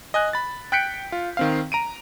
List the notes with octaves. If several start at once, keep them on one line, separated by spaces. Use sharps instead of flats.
D#5 G#5 F#6
B5 A6
G5 F#6 G6 B6 C#7 D7
F4
D#3 C4 F5
A#5 D7 D#7